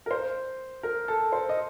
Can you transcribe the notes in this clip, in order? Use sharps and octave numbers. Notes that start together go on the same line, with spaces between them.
A#4
C5
A#4
A4
C5
D#5